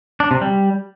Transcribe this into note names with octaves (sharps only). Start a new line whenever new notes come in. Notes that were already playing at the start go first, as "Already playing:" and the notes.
D4
C3
G3